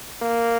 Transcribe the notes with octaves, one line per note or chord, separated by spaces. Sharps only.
A#3